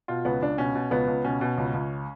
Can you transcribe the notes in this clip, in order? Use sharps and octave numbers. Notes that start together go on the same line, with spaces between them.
B2 F4
C#2 B3
C#2 D4
B2 C#4
B2
C#2 B3
C#2
B2 C#4
B2
C#2
C#2